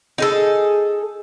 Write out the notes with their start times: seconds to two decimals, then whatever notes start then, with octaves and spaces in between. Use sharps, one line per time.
0.18 D#4 G#4 A4